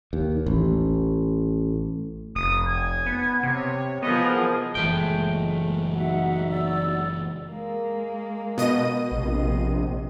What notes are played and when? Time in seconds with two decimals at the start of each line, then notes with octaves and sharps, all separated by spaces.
0.13 D#2
0.46 A1
2.36 F1 D#6
2.67 G#5
3.06 B3
3.43 C3 C#5
4.03 F3 B3 G#4 A#4 D#5
4.75 F#1 A#2 E3 G#3 A3 G5
5.93 D#4 F#4 E5 F#5
6.49 D5 E6
7.49 G#3 A#3
8.58 B2 D#5 D#7
9.11 A#1 C3